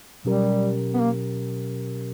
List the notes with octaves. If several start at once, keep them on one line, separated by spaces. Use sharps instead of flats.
B2 F#3 G3 C#4 G4 A#4
B3
A#3